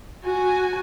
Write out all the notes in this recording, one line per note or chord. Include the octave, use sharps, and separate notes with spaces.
F#4 G#5